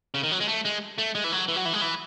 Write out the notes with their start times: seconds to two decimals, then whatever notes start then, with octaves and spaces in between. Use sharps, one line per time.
0.14 C#3
0.23 D#3
0.32 F#3
0.41 G#3
0.48 A3
0.65 G#3
0.98 A3
1.15 G#3
1.24 E3
1.32 F#3
1.48 E3
1.56 F#3
1.65 E3
1.73 G#3
1.81 E3